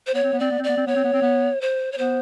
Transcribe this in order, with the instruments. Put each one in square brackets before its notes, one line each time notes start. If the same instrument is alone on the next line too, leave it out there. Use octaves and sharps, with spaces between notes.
[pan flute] C5
[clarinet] B3 [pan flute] C#5
[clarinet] C4
B3
[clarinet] C4 [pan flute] D5
[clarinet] B3
C4
[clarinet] B3 [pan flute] D5
[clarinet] C4
[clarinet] B3 [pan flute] C#5
[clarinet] C4
B3
C4
B3
[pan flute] C5
C#5
[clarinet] B3 [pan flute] C5